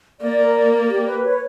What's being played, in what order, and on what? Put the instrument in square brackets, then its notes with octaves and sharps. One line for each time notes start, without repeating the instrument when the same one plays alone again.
[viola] A#3 [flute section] D5
[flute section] A#4
D5
D5
G4
B4
C#5